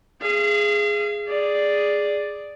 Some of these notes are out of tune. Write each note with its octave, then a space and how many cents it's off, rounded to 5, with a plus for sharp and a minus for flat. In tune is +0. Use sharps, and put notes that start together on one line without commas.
G#4 +0 F5 -40
G#4 +0 D5 +0